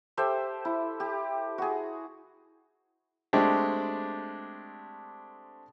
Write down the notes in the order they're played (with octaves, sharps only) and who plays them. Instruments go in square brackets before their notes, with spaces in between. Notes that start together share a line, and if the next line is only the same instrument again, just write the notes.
[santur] G4 A4 C5 E5
E4
G4
F#4 G#4
[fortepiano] G#3 A3 C4 D4 G4